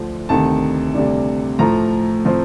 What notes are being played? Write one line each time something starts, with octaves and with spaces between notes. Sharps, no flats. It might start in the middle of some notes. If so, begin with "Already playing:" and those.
Already playing: D2 D3 F3
D2 C3 D#3 A5
D2 C3 G3 D4
A2 F3 A3 A#5
A2 F3 C4